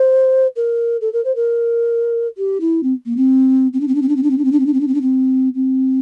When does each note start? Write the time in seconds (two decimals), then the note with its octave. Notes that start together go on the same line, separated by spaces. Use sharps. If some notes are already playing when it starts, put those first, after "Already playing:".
Already playing: C5
0.56 A#4
1.01 A4
1.13 A#4
1.25 C5
1.36 A#4
2.37 G4
2.61 E4
2.83 C4
3.06 A#3
3.17 C4
3.73 C4
3.80 D4
3.88 C4
3.95 D4
4.02 C4
4.09 D4
4.16 C4
4.23 D4
4.30 C4
4.38 D4
4.44 C4
4.52 D4
4.60 C4
4.66 D4
4.73 C4
4.81 D4
4.88 C4
4.95 D4
5.01 C4
5.55 C4